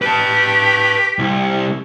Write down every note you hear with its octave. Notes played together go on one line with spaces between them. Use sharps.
G4 B4 A5
C2